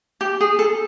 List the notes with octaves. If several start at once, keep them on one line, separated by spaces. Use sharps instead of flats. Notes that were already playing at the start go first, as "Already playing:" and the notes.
G4
G#4
A4